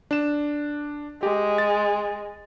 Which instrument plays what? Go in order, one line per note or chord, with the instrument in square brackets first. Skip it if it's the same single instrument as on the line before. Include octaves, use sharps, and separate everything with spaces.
[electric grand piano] D4 E7
[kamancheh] G#3 [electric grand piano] G4
[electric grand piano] A6